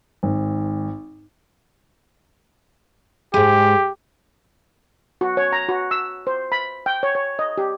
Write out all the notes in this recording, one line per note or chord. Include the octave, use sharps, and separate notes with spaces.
G#1
G#2 G#3 G4
F#4
C#5
A#5
F#4
E6
C5
B5
G5
C#5
C#5
D#5
G4